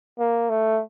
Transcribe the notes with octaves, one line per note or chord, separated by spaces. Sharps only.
A#3
A3